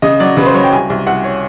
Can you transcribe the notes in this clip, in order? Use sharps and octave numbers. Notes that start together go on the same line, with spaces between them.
C#3 D#5
F#3 D5
C#3 B4
C5
F#3 C#5
G5
C2 G#5
C2
C2 F#5
C#5